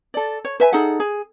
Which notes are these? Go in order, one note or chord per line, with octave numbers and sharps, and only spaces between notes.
A4 D5
C#5
B4 E5 G#5
D#4 G#4 A4 F#5
G#4